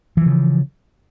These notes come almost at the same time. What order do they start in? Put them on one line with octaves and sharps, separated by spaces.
E3 F3 C#3